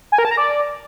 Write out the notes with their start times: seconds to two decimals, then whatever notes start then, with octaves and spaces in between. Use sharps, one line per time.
0.12 G#5
0.18 A#4
0.25 A5
0.31 A#5
0.37 D5